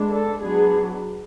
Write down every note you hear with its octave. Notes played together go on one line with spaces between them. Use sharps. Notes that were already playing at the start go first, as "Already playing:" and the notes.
Already playing: G#3 B3 D4
A4
F#3 B3 D4 G#4